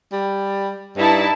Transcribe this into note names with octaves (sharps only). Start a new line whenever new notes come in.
G3
G2 D#4 E4 A5